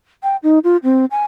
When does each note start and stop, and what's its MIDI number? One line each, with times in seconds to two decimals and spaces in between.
0.23 0.36 79
0.43 0.59 63
0.64 0.77 65
0.84 1.05 60
1.11 1.24 80